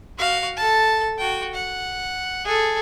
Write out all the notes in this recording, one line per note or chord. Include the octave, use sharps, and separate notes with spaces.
F#4 F5
A4 A5
F#4 G5
F#5
G#4 A4